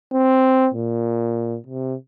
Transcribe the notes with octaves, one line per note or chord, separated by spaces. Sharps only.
C4
A#2
C3